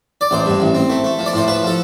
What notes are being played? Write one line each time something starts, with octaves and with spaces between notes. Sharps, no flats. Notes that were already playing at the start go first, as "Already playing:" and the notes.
D5
A1 C5
G2
A1
C4
A3
A3
F3
D5
A2 C5
F3 B4
F3 A4